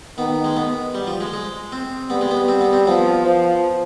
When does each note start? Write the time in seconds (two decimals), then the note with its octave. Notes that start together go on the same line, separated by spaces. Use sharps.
0.18 D#3 B3
0.44 G#3
0.57 B3
0.95 G3
1.07 F3
1.21 G#3
1.33 G#3
1.72 C4
2.10 G3 B3
2.21 G#3
2.31 B3
2.48 C4
2.61 B3
2.73 C4
2.87 F3 B3
3.26 F3